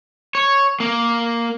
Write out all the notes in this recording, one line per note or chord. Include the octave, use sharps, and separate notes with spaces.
C#5
A#3